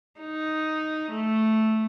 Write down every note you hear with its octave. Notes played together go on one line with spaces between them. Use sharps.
D#4
A3